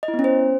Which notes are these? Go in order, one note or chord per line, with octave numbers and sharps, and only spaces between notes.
D#5
E4
B3
C#4
C5